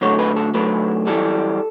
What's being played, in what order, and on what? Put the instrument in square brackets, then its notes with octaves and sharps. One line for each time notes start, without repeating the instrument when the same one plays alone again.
[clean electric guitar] F#2 D3 F#3 A3 C#5
B4
A4
F#2 D3 F#3 A3 B4
F#2 E3 G3 A4